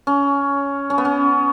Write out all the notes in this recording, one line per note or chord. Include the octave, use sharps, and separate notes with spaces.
C#4
C#4
B3
C#4